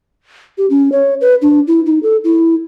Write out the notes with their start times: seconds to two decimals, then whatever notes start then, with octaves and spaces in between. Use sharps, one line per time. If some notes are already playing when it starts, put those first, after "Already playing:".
0.58 G4
0.70 C#4
0.92 C#5
1.21 B4
1.42 D4
1.67 E4
1.86 D#4
2.03 A4
2.24 E4